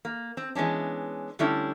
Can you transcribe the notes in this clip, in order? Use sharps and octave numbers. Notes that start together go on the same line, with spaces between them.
A#3
C4
E3 G#3 B3 C#4 D4
D3 G3 A3 C#4 D4 E4